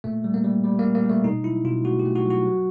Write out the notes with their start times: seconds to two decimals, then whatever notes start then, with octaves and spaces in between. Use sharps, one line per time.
0.04 A#2 A3
0.24 G3
0.34 A#3
0.44 G3
0.64 G3
0.79 A#3
0.85 A#2
0.95 A#3
1.04 G3
1.09 A3
1.24 B2 D#4
1.44 F#3 E4
1.65 B2 F4
1.84 A3 F#4
2.00 G4
2.05 A3
2.16 F#4
2.25 F#3
2.30 F#4
2.46 F#3